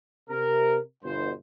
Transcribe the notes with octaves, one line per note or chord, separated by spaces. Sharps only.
C3 A#4
G1 G2 B2 C5